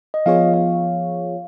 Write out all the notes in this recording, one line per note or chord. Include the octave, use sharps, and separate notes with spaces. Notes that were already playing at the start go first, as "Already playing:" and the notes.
D#5
F3 B3 F4 G#4 C#5 F5
F5